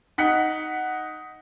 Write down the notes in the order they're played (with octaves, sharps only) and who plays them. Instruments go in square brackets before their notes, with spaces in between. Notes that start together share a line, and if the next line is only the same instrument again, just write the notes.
[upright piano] D#4 F#5 B6